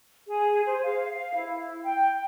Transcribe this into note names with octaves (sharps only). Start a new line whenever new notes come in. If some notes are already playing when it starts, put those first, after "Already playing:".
G#4
C5
F5
F5
E4
G5